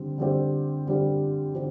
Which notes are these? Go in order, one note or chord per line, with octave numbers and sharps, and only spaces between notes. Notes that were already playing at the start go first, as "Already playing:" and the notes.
Already playing: D3 G3 C4
D3 G3 C4 G4
D3 G3 C4 G4
D3 C4 G4